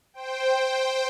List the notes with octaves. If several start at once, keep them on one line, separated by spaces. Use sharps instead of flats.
C5 G5